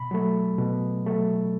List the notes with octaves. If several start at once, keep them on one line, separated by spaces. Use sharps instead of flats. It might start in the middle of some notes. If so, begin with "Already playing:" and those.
Already playing: B2 B5
F#3 A3
B2
F#3 A3